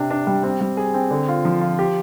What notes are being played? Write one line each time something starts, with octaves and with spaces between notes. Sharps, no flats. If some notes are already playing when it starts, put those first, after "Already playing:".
Already playing: C3 D4
D4
G3
C4
G3
G#4
C4
D3
F4
F3
F4
G4